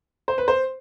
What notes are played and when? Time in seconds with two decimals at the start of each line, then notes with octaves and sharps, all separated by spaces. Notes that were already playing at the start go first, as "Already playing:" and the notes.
0.28 C5
0.38 B4
0.48 C5